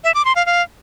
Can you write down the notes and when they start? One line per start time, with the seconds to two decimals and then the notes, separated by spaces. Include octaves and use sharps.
0.04 E5
0.15 D6
0.25 C6
0.36 F5
0.46 F5